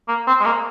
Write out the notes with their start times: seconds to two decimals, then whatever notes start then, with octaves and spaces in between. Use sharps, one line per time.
0.08 A#3
0.27 C4
0.40 G#3
0.45 A#3